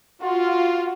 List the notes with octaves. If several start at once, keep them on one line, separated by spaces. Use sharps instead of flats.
F4 F#4